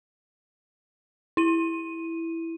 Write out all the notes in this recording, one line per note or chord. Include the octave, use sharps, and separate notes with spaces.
E4 D#7